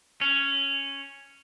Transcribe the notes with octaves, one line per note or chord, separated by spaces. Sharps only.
C#4